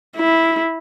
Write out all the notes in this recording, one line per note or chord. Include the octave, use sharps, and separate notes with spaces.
E4